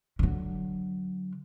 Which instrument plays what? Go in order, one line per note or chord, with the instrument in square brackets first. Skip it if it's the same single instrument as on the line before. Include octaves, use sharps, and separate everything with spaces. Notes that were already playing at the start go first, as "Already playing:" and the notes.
[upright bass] D3 F#3